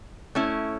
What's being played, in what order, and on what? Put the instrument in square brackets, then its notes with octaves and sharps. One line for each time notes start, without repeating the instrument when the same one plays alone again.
[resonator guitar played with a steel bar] A3 C#4 E4